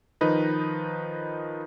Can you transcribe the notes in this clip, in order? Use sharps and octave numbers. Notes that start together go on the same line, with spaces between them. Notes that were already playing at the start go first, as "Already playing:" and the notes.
D#3 F3 D#4 B4 D#5